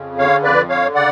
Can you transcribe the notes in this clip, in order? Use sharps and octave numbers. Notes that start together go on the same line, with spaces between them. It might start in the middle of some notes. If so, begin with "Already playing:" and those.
Already playing: F2 C#3
D3 C#5 F5
F2 B4 D5
D3 C#5 F5
C#3 D5 F#5